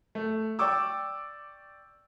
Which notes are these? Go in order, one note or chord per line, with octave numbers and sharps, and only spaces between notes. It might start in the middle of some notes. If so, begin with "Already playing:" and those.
A3
D5 G5 C#6 D6 E6